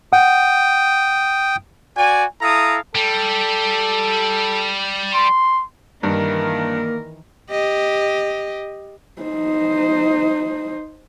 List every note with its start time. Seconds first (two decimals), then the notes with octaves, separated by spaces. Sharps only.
0.13 F#5 G5 D#6
1.97 F#4 D5 G#5
2.42 E4 A4 F5 A#5 D#6
2.95 G3 A4
5.14 C6
6.03 G2 D#3 E3 A#3 A#4
7.51 G4 D#5
9.22 D#4 C5